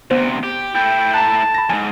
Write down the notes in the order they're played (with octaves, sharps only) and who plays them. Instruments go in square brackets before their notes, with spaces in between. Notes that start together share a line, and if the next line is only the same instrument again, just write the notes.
[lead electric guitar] D2 C3 [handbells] B3 C5
[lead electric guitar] G4
[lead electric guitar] A3 E4 [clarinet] G5
[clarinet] A5 [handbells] A#5 F#6
[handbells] B5 A#6
[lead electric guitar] F2 G#2 [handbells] G#5